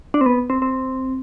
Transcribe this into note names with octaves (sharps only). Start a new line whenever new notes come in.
D4
C4
B3
C4
C4